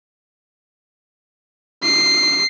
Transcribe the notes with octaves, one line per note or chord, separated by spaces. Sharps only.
C7